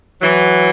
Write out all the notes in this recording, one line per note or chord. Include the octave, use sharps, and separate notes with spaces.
E3 F#3